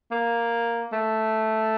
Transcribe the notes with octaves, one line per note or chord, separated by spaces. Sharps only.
A#3
A3